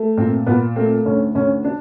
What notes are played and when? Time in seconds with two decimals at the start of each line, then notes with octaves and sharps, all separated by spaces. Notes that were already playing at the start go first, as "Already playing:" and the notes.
Already playing: A3
0.17 A#2 C4
0.46 A#2 B3
0.76 A3 C4
1.05 D2 C#4
1.35 D2 C#4
1.64 D4